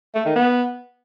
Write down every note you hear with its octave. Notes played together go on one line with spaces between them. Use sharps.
A3
D#3
B3